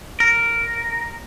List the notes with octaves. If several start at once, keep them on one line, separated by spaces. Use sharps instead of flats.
A#4